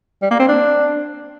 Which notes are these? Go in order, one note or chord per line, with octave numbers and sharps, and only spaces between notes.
G3
A#3
C4
D4